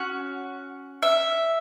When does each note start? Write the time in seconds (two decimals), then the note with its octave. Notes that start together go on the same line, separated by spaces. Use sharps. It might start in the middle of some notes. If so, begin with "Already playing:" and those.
Already playing: C#4 F#4 F#5
1.02 E5